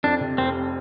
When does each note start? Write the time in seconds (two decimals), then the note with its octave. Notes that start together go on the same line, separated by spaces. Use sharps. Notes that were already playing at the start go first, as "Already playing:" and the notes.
0.03 F2 D4
0.21 C3
0.38 F1 C4